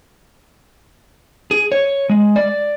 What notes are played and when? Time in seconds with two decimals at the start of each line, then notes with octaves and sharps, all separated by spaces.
1.51 G#4
1.72 C#5
2.10 G#3
2.36 D5